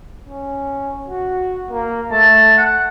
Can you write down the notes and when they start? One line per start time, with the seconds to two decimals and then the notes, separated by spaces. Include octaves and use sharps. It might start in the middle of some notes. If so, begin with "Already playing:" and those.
0.28 C#4
1.08 F#4
1.70 A#3
2.11 A3 A5
2.57 F#5